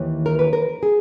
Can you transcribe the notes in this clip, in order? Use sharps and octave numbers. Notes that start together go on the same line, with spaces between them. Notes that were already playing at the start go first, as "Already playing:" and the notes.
Already playing: D#2 E3
A#4
B4
A#4
G#4